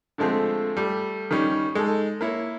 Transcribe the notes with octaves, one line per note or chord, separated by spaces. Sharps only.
D3 F3 G#3 A3 C4
G3 A3
D#3 G3 C#4
G#3 D#4 A4
A#3 E4 C#5